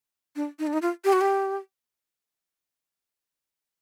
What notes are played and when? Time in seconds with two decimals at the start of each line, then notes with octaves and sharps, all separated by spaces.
0.36 D4
0.59 D#4
0.67 D4
0.73 D#4
0.82 F4
1.05 G4
1.13 F#4
1.21 G4